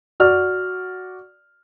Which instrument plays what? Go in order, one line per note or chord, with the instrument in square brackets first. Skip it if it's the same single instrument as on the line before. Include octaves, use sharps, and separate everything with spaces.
[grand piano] F#4 D5 F6